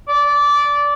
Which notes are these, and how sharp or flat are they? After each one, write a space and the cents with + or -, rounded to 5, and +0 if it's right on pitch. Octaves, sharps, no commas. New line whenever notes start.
D5 -15